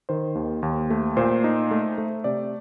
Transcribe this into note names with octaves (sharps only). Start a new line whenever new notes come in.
D#3 C5
D#2
D#2
A3
A#2 C5
D#4
A3
A3
C3 D5